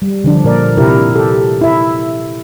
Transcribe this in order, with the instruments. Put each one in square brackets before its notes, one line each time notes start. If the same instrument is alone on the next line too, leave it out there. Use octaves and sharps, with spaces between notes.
[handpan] G3
D3 F3 D4
A#2 A#4 D5
C3 E4 G4 A#4
G4 A4
E4 E5